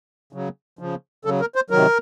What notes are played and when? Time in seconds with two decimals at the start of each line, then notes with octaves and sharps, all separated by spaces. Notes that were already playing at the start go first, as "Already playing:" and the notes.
0.33 C#3 F#3
0.79 C#3 F3
1.25 C#3 F#3 A4
1.41 A#4
1.55 C5
1.70 C3 D#3 F#3 A#4